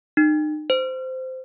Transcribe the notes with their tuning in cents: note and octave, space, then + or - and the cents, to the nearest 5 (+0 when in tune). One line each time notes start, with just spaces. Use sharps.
D#4 -35
C5 -15